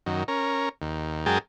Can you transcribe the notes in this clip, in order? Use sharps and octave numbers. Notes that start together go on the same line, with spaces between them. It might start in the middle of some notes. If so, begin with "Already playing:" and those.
F#2 D#3
C#4 A#4
D#2
F#2 G#3 G#4 A#4 G5 A5